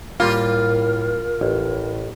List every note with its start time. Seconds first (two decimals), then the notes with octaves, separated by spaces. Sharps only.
0.20 A2 G3 A#3 F4 A#4
1.41 A1 A2